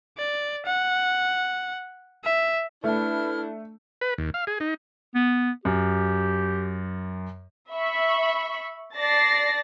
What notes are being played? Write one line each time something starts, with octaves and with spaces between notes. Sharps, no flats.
D5
F#5
E5
A3 D4 E4 B4 F6
B4
D#2
F5
G#4
D#4
B3
F#2 G4
E5 B5 C#6
D5 A5 A6 A#6 C7